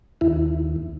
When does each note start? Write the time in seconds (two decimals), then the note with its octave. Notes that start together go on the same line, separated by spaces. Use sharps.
0.21 D#2 E4